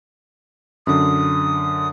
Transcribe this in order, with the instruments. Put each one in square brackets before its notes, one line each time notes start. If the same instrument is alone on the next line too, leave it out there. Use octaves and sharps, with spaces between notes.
[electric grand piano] F#2 D3 [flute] D#6